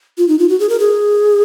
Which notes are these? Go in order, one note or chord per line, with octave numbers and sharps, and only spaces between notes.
F4
D#4
F4
F#4
G#4
A#4
G#4